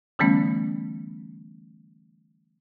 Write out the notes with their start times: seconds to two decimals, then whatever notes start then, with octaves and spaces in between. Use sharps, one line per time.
0.19 D3 E3 G3 A3 B3 C#4